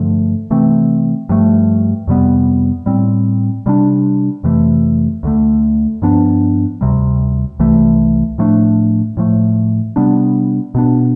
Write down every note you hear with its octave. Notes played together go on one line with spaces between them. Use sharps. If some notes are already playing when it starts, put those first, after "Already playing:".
Already playing: G2 D3 F3 A3
C3 E3 A3 C4
G2 F3 A3
F2 C3 G3 B3
A2 G3 C4
C3 G3 B3 D4
F2 C3 E3 A3
D2 D3 A3
G2 F3 B3 D4
D2 C3 G3
C2 C3 E3 A3
A2 F3 A3 D4
A2 F3 A3
C3 G3 B3 D4
B2 B3 D4